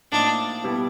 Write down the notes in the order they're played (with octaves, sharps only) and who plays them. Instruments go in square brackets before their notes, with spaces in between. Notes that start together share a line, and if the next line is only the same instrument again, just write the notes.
[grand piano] A2 F3 A#3 D#4 [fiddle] D4
[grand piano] B2 G3 B3 E4 G4